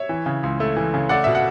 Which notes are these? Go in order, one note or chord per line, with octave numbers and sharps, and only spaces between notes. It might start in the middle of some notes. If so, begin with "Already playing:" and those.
Already playing: C#5 E5
E3
C#3
C#2
A3
E3
C#3
A3 D5 F#5
B2 E5
F#5